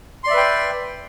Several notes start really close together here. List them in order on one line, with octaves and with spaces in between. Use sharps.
C6 D5 E5 B4 G5